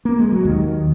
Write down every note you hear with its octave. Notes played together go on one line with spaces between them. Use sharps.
A#3
G#3
F#3
D#2 D#3